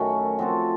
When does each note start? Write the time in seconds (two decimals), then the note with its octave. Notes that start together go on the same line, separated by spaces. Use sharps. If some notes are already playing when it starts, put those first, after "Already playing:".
Already playing: F#2 D#3 F#3 A3 C#4 F#4
0.39 F3 C4 F#4 A4